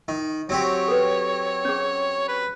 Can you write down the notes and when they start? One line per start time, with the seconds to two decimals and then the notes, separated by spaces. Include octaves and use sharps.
0.08 D#3
0.49 F#3 C4 G4 C#5
0.88 A4 B4
1.65 C#4 G#4
2.28 B4